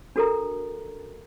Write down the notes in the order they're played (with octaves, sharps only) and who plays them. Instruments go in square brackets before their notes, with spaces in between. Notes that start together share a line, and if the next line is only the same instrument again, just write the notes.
[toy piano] D4 F#4 A4 A#4 A#5